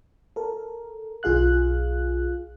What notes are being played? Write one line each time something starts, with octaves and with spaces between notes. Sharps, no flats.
A4 A#4
B1 F4 G#4 F5 F#6